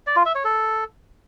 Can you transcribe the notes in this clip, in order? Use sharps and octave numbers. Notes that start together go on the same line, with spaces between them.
D5
F4
E5
C#5
A4